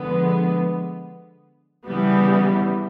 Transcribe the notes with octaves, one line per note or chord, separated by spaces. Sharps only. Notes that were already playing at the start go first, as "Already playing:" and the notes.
Already playing: D3 F3 G#3 B3
C#3 E3 G3 B3